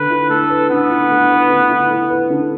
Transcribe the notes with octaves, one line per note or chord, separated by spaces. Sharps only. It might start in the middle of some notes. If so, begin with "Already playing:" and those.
Already playing: D3 B4
E4
A3 A4
B4
D3 B3
E4
A3
B4
D3
E4
A3
B4
D3